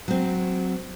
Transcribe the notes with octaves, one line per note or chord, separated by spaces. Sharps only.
F#3 C4